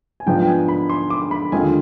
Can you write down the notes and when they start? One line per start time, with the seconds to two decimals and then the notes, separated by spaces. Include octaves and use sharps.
0.20 G#5
0.26 G#2 F3 B3 D4 F4 G5
0.42 G5
0.47 G#5
0.68 B5
0.90 C6
1.10 D6
1.31 B5
1.52 D#2 D3 G#3 C4 F4 G#5